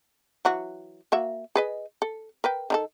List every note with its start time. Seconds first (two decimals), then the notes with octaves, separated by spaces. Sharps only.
0.45 E3 F#3 F#4
1.12 A#3 F#4 E5
1.55 G#4 B4 D#5
2.02 A4
2.44 A#4 B4 G5
2.70 D#3 D#4 A4